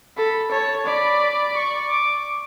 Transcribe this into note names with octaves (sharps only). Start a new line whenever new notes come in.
A4 B5
C#5 A5
D5 B5
C#6
D6